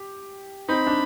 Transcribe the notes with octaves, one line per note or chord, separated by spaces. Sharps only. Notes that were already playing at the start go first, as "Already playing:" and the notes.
Already playing: G4
C4 D#4 B5
D4